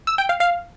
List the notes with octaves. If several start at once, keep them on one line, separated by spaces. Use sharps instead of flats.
E6
G5
F5
F5